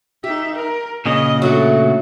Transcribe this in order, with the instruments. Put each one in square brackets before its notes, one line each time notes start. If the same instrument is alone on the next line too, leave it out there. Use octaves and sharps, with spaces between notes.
[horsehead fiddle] D#4 E5 [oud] G4
[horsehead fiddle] A#4
[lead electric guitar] A#2 C#3 [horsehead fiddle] D#5
[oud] F#3 A3 D4 [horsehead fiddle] F#4